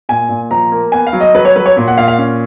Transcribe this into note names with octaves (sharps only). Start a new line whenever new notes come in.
A#2 G#5
A#2
F3 A#5
A#3
B3 G#5
F5
F#3
D#5
F#3 B4
C#5
F#3 B4
C#5
A#2
F#5
A#2 F5
F5
C#4